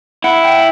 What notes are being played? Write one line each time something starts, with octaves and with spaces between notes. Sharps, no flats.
E4 F#5
G5